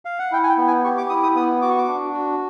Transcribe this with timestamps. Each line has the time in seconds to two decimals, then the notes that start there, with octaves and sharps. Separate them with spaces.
0.05 F5
0.19 F#5
0.32 E4 G5
0.43 G#5
0.49 G5
0.58 B3
0.67 G#5
0.84 G4 C#6
0.98 D6
1.09 E4 D#6
1.23 D#6
1.35 B3 D#6
1.62 F#4 D6
1.70 C#6
1.78 D6
1.88 D4
2.13 F#4